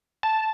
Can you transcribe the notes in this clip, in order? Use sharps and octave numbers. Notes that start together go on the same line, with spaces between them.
A5